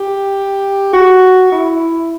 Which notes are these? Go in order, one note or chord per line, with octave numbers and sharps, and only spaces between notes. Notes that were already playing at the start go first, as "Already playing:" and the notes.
Already playing: G4
F#4
E4